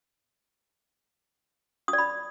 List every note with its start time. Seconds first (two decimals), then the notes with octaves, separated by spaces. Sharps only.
1.88 D#6
1.93 D5
1.98 B5